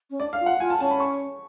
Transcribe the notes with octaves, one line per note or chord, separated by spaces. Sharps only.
C#4
D4 D5
F5
F4
F#5
F4 G#5
A5
C#4 A5
B5
C#6